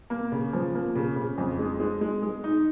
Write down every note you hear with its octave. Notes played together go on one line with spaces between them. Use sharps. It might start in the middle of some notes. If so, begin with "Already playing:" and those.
A#3
C#3
F3
A#3
C#3
C#3
F2
G#3
G#3
G#3
G#3
D#4